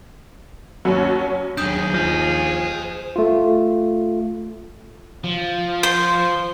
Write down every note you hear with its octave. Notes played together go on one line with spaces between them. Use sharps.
D#2 F#3 C#4
D#2 F#3 D4 G#4 D#6 G6
F3 C5 D#5
A3 F4
F3
C5